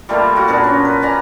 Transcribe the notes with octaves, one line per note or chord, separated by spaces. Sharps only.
G3 A3 A#3 F4
F4 F#4
A#2 B3 D4 A#4
C#4
B4
D5 F#5 G#5 A#5